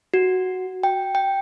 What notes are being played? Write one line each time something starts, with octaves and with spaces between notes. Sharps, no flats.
F#4
G5
G5